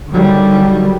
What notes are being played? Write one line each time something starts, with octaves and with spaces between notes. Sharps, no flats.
D3 D#3 F#3 G3